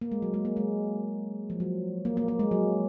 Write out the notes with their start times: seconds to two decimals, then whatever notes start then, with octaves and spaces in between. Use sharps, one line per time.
0.01 A#3
0.12 G#3
0.22 F#3
0.34 G#3
0.45 A#3
0.57 G#3
1.50 F3
1.60 F#3
2.05 A#3
2.17 A#3
2.28 A#3
2.40 G#3
2.51 F#3